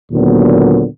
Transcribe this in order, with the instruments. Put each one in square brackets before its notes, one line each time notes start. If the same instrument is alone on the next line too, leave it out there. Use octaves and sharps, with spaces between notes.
[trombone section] D#2 A#2 D3 F#3 B3